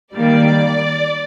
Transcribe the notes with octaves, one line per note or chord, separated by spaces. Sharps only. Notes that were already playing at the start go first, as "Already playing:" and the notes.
D#3 G3 A#3 D5